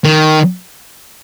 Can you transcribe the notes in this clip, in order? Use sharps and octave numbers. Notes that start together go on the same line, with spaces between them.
D#3